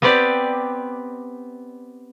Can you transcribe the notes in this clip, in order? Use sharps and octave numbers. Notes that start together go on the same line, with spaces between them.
B3 C4 G4 B4 D5